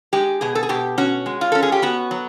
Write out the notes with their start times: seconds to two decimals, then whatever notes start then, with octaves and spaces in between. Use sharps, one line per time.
0.13 G#3 G4
0.41 B2 G#4
0.55 A4
0.63 G#4
0.69 B2 G4
0.98 C#4 F#4
1.26 G#3
1.41 F4
1.52 C#4 A4
1.63 G#4
1.72 G4
1.82 B3 F#4
2.11 F#3